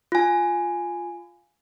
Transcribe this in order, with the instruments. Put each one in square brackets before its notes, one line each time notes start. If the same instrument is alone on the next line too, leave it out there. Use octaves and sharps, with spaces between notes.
[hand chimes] F4 G#5